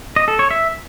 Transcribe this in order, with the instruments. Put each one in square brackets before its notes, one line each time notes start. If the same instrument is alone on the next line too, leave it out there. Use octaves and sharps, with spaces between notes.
[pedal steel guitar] D#5
A4
C#5
E5